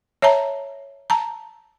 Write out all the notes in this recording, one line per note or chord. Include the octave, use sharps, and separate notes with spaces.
C#5 E5 A5 A#5
A5 A#5